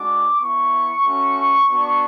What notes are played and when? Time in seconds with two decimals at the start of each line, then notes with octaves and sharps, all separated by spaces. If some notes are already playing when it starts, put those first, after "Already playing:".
Already playing: G#3 D4 F#4 D6
0.40 B3 E4 C#6
1.03 A3 C#4 F#4
1.68 B3 D4 F#4